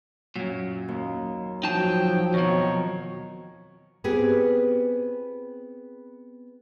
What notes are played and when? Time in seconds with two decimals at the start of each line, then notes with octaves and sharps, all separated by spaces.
0.36 F#2 A#2 F#3
0.88 D#2
1.63 F3 F#3 D#4 G5 A5
2.34 F2 B2 D#3 C#5 C#6
4.04 B3 C4 F4 G4 G#4 B4